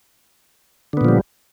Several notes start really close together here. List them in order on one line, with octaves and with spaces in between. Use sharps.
D3 B3 A#2 F3 G3